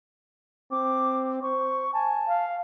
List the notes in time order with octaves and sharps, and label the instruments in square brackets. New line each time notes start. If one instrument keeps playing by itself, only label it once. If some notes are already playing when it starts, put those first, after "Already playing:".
[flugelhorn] C4 [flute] D6
[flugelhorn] C5 [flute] C#6
[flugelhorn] G#5 [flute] A5
[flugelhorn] F5